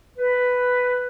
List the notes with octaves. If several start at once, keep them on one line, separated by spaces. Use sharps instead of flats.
B4